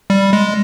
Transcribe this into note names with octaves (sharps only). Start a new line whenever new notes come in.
G3
G#3